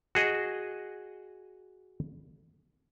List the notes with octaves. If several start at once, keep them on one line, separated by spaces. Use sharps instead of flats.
F#4 G#4 D#5